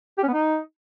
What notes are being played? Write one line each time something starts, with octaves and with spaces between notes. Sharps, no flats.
G4
C#4
B3
D#4